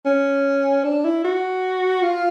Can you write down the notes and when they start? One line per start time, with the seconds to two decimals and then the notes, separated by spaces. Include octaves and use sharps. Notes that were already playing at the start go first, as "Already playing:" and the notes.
0.06 C#4
0.84 D4
1.05 E4
1.25 F#4
2.03 F4